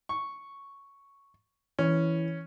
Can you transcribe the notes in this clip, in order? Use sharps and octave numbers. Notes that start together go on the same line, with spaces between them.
C#6
E3 C#4